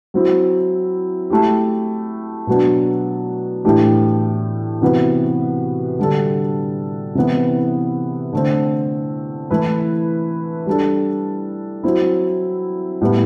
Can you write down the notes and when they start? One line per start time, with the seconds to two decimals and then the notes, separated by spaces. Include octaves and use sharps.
0.14 F#3 C4 E4
1.30 A3 E4 G4
2.47 B2 F#3 B3 D4
3.64 A2 E3 A3 D4 G4
4.82 C3 E3 B3 F#4 B4
5.99 D3 G3 D4 A4
7.15 C3 E3 B3 E4
8.33 D3 A3 C4
9.51 E3 A3 E4 B4
10.66 G3 D4 A4
11.83 F#3 C4 E4
13.01 A2 G3 B3 E4